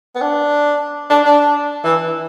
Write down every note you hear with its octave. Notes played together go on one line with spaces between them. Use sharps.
B3
D4
D4
D4
E3